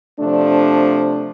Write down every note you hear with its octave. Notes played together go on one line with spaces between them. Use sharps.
C3 F3 A3 D4